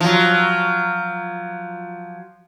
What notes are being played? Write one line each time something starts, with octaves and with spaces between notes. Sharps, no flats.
F3 F#3